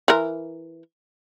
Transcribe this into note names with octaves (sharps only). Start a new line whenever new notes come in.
E3 A#4